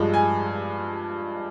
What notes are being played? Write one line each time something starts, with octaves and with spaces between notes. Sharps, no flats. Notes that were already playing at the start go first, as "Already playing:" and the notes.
Already playing: G2 F3 G#3
G#5